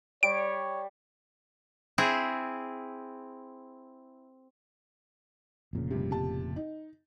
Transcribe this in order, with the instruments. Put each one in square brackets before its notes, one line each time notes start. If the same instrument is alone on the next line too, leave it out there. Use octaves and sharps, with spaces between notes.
[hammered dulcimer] G3 [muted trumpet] C#5 [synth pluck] D7
[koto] C4 E4 G#4
[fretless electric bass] F1 A#2 C#3
[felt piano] G2 C3
C3 A5
D#4